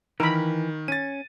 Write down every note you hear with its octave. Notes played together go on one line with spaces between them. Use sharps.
D#3 E3 A#4 B5
C#4 A6 D#7